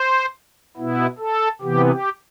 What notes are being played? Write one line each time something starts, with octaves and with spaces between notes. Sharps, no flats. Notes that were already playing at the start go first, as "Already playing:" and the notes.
Already playing: C5
B2 B3 E4
A4
C3 E3 B3 G4
G4